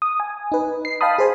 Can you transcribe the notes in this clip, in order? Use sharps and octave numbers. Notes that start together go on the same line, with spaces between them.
D#6
G#5
D#4 B4
C7
D#5 F5 G5 A5 B5 D#6
G#4 C5 G#5